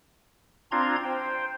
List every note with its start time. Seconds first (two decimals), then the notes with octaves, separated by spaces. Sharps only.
0.72 C4 D4 F4 A#5 C6 G#6
1.04 C5 G5